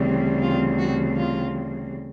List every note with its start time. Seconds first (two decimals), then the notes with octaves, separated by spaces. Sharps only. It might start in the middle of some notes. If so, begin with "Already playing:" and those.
Already playing: D2 C#3 E3 G3 C4
0.42 F4
0.79 F#4
1.17 F4